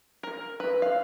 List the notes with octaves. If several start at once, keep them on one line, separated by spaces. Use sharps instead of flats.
A#4
B4
F5